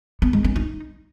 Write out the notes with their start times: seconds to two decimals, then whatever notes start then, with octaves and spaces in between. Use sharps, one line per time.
0.22 B3
0.33 G#3
0.44 C#4
0.56 D#4